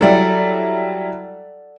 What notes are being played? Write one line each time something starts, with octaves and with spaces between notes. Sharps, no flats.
F#3 G3 E4 A4 D5 F#5